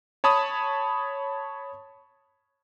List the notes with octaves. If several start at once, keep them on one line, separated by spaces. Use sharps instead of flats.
C#5 A5 B5 D#6